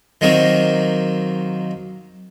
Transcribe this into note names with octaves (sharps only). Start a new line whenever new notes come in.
D#3 F#3 A#3 C4